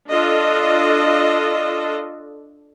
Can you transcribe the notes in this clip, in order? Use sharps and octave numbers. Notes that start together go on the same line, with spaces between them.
D4 F4 A4 D#5